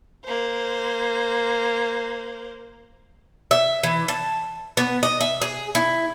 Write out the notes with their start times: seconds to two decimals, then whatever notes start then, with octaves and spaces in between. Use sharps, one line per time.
0.25 A#3 C5
3.51 E5
3.83 E3
4.08 A5
4.77 B3
5.03 D#5
5.21 E5
5.42 G#4
5.75 E4